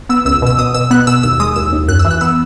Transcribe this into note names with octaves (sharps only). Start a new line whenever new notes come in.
B3 E6
C#2 E6
B2 E6
B2 D#6
B2 E6
B3 F#6
B2 E6
D#2 E6
G#3 D#6
D#2 E6
D#2
F#2 F#6
E6
E3
F#6
B3 E6